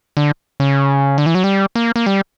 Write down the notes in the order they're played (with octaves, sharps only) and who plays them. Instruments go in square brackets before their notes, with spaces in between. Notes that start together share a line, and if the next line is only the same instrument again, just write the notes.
[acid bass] D3
C#3
D3
E3
F#3
G3
A#3
A#3
G3